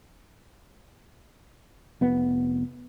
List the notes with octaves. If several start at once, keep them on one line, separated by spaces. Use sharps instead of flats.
F1 B3